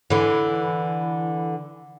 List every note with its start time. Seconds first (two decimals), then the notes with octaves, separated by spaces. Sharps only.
0.10 D3 E3